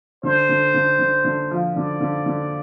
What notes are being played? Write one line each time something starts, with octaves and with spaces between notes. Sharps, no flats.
D3 C5
D3
D3
D3
D3
F3
D3 D5
D3
D3